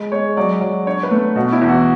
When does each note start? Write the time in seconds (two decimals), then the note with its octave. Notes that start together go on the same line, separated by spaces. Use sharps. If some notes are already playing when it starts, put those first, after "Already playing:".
Already playing: G#3
0.12 G#3 C#5
0.37 F#3 D5
0.61 F#3
0.87 D4 C#5
1.03 B4
1.11 A3
1.36 B2 F#4
1.53 E4
1.61 E2
1.69 F#4